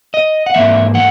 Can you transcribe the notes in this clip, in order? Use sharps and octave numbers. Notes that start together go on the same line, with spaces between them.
D#5
F#5
G#2 E3 A#3 E5
F#5